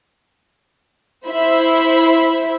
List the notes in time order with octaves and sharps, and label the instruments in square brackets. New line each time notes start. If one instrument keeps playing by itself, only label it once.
[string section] E4 C5 E5 B5